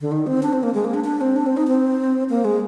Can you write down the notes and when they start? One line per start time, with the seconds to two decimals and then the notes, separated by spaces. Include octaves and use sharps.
0.01 D3
0.12 D#3
0.27 C4
0.43 D4
0.53 C4
0.63 A#3
0.74 G#3
0.85 A#3
0.94 D4
1.04 D4
1.21 C4
1.36 D4
1.46 C4
1.57 D#4
1.67 C4
2.30 A#3
2.45 G#3